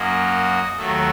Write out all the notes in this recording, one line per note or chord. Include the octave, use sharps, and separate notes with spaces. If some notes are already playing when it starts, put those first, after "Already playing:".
Already playing: F#2 F#3 A#3 D#5
D#2 D#3 F#3 A3 A4